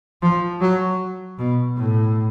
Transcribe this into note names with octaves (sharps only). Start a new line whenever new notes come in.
F3
F#3
B2
A2